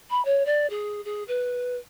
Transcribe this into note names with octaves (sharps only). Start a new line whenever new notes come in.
B5
C#5
D5
G#4
G#4
B4